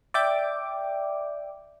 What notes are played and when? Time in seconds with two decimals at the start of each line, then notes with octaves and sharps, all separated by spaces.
0.14 D5 E5 G5 D6